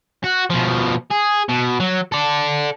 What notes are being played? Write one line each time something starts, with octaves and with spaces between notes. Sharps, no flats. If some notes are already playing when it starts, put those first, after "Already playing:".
F#4
B2 F3
G#4
B2
F#3
A4 D5